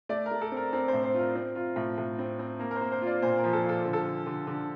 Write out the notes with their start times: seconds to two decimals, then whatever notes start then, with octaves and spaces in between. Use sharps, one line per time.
0.09 A3 D5
0.26 A#4
0.31 A3
0.41 A4
0.52 C4 A#4
0.73 C4 A#4
0.88 C5
0.93 A2
1.04 C5
1.14 F4 A#4
1.35 C4
1.55 F4
1.76 A2
1.98 A2
2.19 C4
2.39 C4
2.59 A#3 A#4
2.71 A#4
2.76 C5
2.81 A#3
2.92 C5
3.02 F4
3.07 D5
3.22 A#2 C5
3.38 A#4
3.44 F3
3.53 A4
3.64 F4
3.69 A4
3.85 D3
3.93 A4
4.06 D3
4.27 D3
4.47 D3